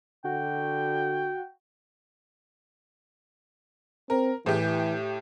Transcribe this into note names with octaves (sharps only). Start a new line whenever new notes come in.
D3 F#4 G5
C4 A#4
A2 E3 G4